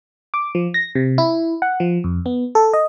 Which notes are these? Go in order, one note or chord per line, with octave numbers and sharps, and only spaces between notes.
D6
F3
A#6
C3
E4
F#5
F3
F2
B3
A4
D#5